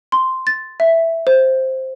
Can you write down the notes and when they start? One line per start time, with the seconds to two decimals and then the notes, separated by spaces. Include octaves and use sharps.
0.12 C6
0.47 A6
0.80 E5
1.27 C5